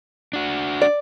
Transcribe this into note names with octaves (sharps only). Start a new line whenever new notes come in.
D4 F#4
D5